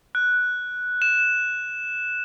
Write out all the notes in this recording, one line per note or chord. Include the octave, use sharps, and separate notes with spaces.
F#6
E7